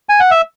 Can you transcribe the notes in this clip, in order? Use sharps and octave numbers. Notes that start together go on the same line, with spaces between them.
G#5
F#5
E5